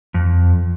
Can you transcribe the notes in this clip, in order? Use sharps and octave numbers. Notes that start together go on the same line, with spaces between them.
F2